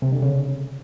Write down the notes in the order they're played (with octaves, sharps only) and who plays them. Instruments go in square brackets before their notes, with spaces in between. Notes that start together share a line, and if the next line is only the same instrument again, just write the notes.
[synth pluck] C3
D3
C#3